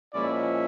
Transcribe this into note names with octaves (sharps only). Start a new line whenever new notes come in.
A#2 F3 G#3 C#4 E4 D5